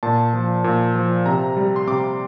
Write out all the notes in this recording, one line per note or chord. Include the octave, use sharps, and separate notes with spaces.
A#2 A5
F3
A#2
F3
C3 A#5
G3
C6
C3 D6